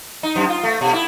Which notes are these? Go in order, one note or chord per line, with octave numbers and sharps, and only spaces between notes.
D#4
F#2
F4
A3
B2
E4